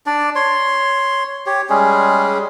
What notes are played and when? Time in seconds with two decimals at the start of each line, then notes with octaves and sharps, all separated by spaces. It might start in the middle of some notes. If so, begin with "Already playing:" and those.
0.06 D4 D5
0.36 C#5 C6
1.46 G4 C#5
1.69 G3 G#3 C#4 G#4